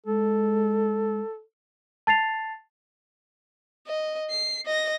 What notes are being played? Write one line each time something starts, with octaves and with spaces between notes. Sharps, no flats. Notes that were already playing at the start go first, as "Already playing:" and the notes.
G#3 A4
A5 A6 C7 F7
D#5
C7
D#5 A#6